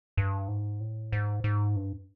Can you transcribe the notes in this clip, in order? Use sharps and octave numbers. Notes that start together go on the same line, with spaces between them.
G2
G#2
A2
G#2
G#2
G2